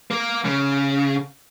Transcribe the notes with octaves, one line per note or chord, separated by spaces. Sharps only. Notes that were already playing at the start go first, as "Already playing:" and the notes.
A#3
C#3